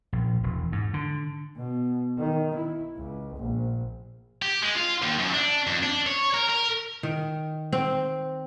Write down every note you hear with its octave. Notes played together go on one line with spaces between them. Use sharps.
A#1
E1
G#2
D3
B2
D#3
E4
C#2
A#1
G4
G#3
F4
D#2
F#2
D4
F2
D4
C#5
A#4
A#4
D#3
C4